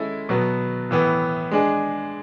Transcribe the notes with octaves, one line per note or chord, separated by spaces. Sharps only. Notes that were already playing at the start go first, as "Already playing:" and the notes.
Already playing: G#3 C#4 E4 A4
B2 F#3 B3
A2 E3 B3
G#3 D4 G#4